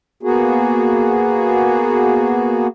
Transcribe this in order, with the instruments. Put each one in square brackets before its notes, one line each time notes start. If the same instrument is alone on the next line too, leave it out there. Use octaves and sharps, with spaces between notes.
[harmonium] A#3 B3 F#4 G#4